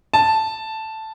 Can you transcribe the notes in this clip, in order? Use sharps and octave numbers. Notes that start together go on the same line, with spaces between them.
A5